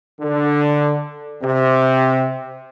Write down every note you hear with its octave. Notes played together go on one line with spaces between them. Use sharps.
D3
C3